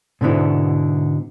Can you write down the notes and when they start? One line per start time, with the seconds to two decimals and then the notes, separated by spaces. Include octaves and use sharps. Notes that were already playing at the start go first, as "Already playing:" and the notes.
0.21 G#2 B2 D3 B3 E4